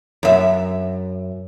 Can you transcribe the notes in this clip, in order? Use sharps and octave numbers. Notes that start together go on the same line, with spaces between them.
F#2 E5